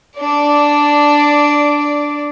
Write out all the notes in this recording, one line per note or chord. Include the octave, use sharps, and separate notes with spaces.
D4 D5